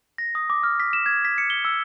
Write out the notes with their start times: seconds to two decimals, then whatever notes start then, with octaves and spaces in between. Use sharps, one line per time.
0.18 A#6
0.35 D#6
0.50 D6
0.63 F6
0.80 B6
0.93 E7
1.06 G#6
1.25 B6
1.38 C#7
1.50 G7
1.65 E6